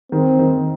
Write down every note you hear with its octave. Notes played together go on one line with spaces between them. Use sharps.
D#3 C4
D#3